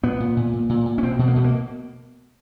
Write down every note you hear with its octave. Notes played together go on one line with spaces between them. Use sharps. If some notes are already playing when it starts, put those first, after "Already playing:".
A#2 B3
A#2
A#2
A#2
A#2
A#2
C#4
B2 C4
B2
A#3
B2 A3
A#3